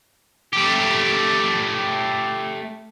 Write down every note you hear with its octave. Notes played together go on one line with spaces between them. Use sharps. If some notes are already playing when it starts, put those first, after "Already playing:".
A3 G4